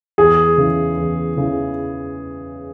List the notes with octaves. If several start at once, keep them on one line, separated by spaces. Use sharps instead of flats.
E2 G#4
C#3 E3
E2
C#3 E3